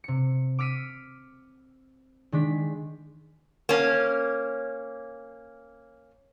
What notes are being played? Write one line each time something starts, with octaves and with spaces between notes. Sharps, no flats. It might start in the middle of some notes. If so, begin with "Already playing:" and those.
C3 C#7
D6 E6 F6 B6 C#7 D#7
D#3 G#3 D4 B6
A#3 C#4